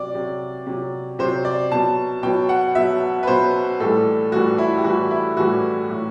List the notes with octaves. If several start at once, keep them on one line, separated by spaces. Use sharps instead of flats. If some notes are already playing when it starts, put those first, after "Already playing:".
Already playing: C3 F#3 D5
C3 F#3
C3 F#3
C3 F#3 C5
D5
B2 F#3 A5
B2 F#3 G5
F#5
B2 F#3 E5
B4
B2 F#3 C5
A2 E3 G3 A4
A2 E3 G3 F#4
E4
G4
A2 E3 G3 F#4
E4
A2 E3 G3 F#4
A2 F#3